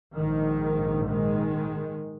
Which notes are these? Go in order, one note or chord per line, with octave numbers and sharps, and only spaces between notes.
A#1 G#2 D#3
D#3 G#3